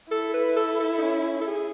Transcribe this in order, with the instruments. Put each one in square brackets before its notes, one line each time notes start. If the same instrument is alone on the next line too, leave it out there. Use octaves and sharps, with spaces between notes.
[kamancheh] E4 [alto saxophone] A4
[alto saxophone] B4
A4
A4
D#4
C#4
A4
G#4